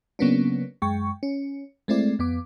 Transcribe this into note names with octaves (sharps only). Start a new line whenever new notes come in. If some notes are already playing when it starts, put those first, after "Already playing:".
C#3 F#3 A#3 B3 C#4 D4
F#2 G#3 G5 C#6
C#4
G#3 A3 C4 E4 D5
F2 B3 D6